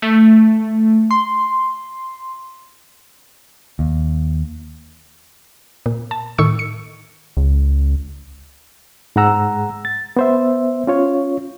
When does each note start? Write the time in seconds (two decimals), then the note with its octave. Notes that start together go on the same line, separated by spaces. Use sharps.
0.02 A3
1.11 C6
3.79 D#2
5.86 A#2
6.11 A5
6.38 A2 D#3 C#6 E6 C#7
6.59 C#7
7.37 C#2
9.16 G#2 G#3 G#4 F#5 A#5 E6
9.85 A6
10.17 B3 C5 E5
10.87 C#4 F4 C#5